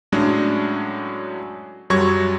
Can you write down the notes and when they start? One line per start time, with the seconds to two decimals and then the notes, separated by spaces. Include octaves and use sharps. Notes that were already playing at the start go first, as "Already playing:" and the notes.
0.12 A2 F#3 G#3 C#4 D4
1.90 F#2 F#3 G3 C#6 G#6